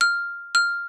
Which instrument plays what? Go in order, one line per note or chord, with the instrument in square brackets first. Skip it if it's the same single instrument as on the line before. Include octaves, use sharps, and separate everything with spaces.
[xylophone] F6
F6